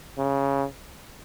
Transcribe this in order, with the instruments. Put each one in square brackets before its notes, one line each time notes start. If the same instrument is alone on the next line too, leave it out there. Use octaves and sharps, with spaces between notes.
[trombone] C#3